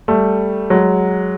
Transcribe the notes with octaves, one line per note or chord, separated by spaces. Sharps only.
G3 A3
F#3 G#3